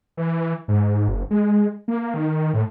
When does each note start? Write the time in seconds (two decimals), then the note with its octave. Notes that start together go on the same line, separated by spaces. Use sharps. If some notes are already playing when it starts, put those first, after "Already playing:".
0.17 E3
0.68 G#2
1.08 F#1
1.31 G#3
1.88 A#3
2.14 D#3
2.54 A2